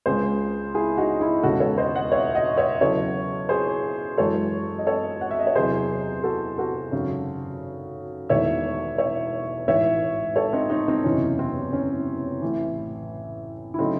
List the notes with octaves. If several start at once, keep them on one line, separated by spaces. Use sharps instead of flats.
C#2 C#3 G#3 G#4 C5
E4 G#4
D#4 F#4
E4 G#4
E1 D#2 C#3 G#3 F#4 A4
A4 C#5
C5 D#5
D#5 F#5
C#5 E5
D#5 F#5
C#5 E5
E2 C#3 F#3 A4 C#5
G#4 C5
F#2 E3 G#3 A4 C#5
D#5
A4 C#5
F#5
E5
D#5
C#5
E2 C3 F#3 G#4 C5
F#4 A4
F#4 A4
G#1 F#2 C#3
E1 E2 D#3 A3 C#5 E5
C#5 E5
A1 G#2 E3 C#5 E5
A4 C#5
C4 D#4
C4 D#4
C4 D#4
F#1 E2 C3 E3 C#4
C4
C#4
A1 A2 E3
E4
C#3 F#3 A3 C4 D#4